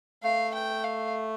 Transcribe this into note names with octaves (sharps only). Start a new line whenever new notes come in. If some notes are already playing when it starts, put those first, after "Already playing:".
A3 F5
G5
F5